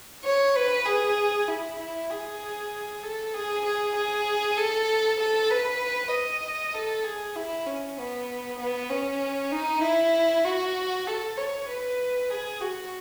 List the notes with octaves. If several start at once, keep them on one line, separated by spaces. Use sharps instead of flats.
C#5
B4
G#4
E4
E4
G#4
A4
G#4
G#4
G#4
A4
A4
B4
D#5
A4
G#4
E4
C#4
B3
B3
C#4
D#4
E4
F#4
A4
C#5
B4
G#4
F#4